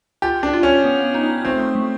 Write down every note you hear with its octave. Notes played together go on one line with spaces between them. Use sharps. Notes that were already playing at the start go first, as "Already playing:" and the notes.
F4 G4
D4
F4
C#4
B3
D#4
A3 C4
A3